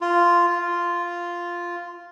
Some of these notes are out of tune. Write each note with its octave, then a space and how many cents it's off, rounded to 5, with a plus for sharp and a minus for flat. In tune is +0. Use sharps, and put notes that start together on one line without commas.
F4 -5
F4 -5